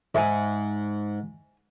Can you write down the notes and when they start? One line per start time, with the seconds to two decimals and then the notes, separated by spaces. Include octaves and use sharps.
0.15 G#2 E5 G#5